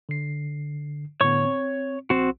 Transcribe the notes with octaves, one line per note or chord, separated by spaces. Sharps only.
D3 C7
A2 D3 B3 C#5 C#6
C4
A#1 C4 F#4